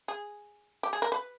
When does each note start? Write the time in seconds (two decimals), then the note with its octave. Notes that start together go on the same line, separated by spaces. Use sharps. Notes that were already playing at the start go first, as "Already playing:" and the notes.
0.08 G#4
0.83 G4
0.93 G#4
1.02 A#4
1.12 B4